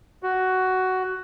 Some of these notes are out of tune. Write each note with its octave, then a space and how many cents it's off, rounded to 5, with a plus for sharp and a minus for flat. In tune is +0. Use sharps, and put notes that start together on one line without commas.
F#4 +10